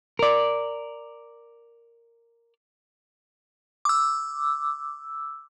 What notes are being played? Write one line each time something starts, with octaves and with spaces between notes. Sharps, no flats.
A#4 D5
D6 E6